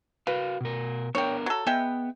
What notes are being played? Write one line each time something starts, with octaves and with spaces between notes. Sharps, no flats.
F#4 A#4 B4 F5
B2 A#4
B3 D4 A#4 C#5 G5
F#3 A4
G#3 B3 E5 G5